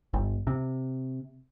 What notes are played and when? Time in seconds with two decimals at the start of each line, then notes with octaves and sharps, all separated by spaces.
0.14 G1
0.47 C3